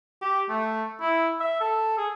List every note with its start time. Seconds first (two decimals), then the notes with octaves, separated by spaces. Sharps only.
0.22 G4
0.49 A3
1.00 E4
1.40 E5
1.60 A4
1.98 G#4